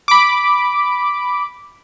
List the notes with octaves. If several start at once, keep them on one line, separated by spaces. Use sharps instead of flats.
B5 D6